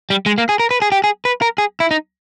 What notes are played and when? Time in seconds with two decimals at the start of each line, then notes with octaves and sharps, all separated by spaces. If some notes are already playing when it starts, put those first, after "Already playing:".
0.10 G3
0.26 G#3
0.38 A#3
0.49 G#4
0.60 A#4
0.71 B4
0.82 G#4
0.92 G4
1.04 G#4
1.25 B4
1.42 A#4
1.58 G#4
1.80 E4
1.91 D#4